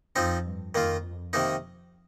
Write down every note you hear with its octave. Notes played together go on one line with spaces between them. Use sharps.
F2 F3 C4 D#4
G2
F2 D#3 A#3 F4
C3 D#3 A#3 D#4